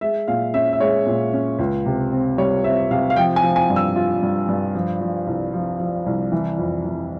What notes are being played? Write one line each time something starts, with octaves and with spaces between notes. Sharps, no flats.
G#3 E5
A#2 F5
C#4 E5
E5
G#3 C#5
A#2
C#4
C#2
C3
C4
G3 C#5
C4 E5
C3 F5
F5
F3 G5
G#5
F3
G#5
G2
E6
F4
G2
G2
F3
F3
C2
F3
F3
C2
E3
F2
E3